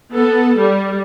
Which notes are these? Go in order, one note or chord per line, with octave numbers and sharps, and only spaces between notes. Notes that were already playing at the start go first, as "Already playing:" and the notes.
B3 A4
G3